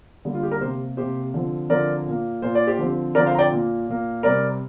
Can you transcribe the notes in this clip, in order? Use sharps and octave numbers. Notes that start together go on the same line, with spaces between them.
D3 G3 A#3
F4
G4
A#4
C3 A#3 G4 C5
C3 A#3 G4 C5
D3 F3 C4
D3 F3 C4 A#4 D5
A#2 A#3
A#2 A#3 C5
D5
G4 C5
D3 F3 C4
D3 F3 C4 A#4 D5
C5 F5
A#5
D5 G5
A#2 A#3
A#2 A#3
C3 G3 C4 A#4 D5